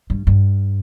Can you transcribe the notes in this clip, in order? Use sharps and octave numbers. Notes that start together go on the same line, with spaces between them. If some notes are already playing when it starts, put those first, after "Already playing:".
G2
G2